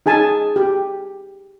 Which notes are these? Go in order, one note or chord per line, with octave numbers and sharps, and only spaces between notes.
D#4 G#4 G#5 A5
G4